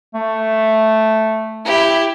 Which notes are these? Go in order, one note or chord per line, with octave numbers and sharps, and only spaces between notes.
A3
E4 G4